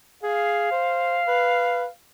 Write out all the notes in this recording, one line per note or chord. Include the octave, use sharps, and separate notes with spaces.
G#4 F5
C5
B4